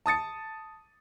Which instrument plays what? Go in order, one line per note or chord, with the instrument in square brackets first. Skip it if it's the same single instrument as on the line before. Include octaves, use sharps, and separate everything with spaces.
[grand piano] A5 D#6 A6 C#7